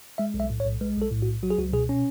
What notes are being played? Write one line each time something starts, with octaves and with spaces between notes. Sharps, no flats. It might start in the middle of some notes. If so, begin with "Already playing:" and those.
G#3 E5
B1
E5
A2
C#5
B1
G#3 B4
B1 A4
A2
F#4
B1
F#3 F#4
G#4
C#2 F#4
B2 G#4
C#4